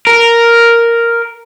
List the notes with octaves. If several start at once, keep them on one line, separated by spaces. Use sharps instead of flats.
A#4